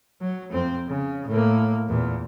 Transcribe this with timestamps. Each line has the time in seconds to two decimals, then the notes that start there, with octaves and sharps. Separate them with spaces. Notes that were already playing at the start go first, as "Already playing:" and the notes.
0.21 F#3
0.52 F2 C4
0.87 C#3
1.28 A2 A#3
1.88 E2 A#2